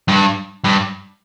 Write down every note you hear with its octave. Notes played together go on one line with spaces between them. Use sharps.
G2
G2